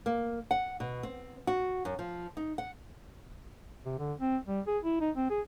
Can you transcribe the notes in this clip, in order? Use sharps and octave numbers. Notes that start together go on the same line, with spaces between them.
A#3
F#5
B2
C4
F#4
F#2
F3
D#4
F#5
C3
D3
C4
G3
G#4
E4
D#4
C4
G#4